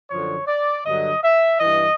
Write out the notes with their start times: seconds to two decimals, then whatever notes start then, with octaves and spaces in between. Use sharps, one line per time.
0.11 F#2 D3 F3 C#5
0.47 D5
0.85 G2 D3 F#3 D#5
1.23 E5
1.60 G2 E3 D#5